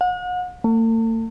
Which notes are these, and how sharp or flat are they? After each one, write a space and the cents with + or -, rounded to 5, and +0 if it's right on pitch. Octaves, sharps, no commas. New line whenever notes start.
F#5 -40
A3 +45